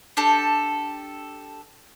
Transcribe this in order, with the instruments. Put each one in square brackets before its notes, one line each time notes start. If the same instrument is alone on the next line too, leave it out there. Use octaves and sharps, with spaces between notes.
[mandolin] D4 G4 A4